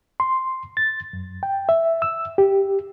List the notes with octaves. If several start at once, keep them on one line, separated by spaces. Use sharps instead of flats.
C6
A6
F#2
G5
E5
E6
G4